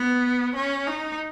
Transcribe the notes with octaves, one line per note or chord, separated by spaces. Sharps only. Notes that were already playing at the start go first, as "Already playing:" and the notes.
Already playing: B3
C#4
D#4